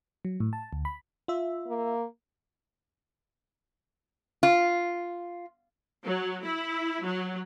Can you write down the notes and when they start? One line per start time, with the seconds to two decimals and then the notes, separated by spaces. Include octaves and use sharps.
0.25 F#3
0.40 A2
0.53 A5
0.73 D2
0.85 B5
1.28 F4 E5
1.68 A#3
4.43 F4
6.06 F#3
6.44 E4
7.04 F#3